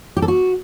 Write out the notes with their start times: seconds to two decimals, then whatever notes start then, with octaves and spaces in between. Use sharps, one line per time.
0.17 G4
0.22 A4
0.28 F#4